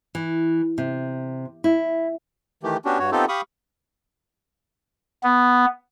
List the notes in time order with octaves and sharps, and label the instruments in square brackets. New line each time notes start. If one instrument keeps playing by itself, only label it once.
[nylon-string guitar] E3
C3
E4
[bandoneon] D#3 E3 A3 G4
B3 C#4 D4 F#4 G4
G2 F#4 C#5
B3 C4 D#4 F4 G4 A4
G4 F5 B5 C#6 D#6
[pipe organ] B3